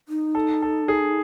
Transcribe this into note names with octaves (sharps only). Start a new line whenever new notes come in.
D#4
A4
A4
G#4